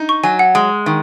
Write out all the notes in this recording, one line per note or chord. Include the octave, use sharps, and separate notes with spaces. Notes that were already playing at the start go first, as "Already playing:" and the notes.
Already playing: D#4
C#6
F#3 G#5
F#5
G#3
D#3